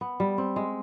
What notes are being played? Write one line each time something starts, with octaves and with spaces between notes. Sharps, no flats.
B3
G3
C4
G#3